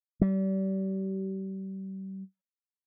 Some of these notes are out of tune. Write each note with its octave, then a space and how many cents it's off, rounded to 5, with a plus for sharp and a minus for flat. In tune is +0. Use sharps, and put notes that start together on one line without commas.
G3 -35